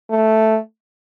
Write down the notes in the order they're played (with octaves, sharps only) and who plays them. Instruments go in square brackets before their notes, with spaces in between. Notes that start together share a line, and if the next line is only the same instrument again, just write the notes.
[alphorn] A3